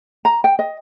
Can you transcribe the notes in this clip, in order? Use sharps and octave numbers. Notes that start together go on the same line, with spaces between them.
A#5
G5
D#5